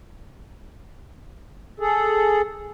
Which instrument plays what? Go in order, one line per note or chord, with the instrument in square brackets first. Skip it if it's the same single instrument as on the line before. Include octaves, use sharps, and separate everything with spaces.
[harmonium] G#4 A4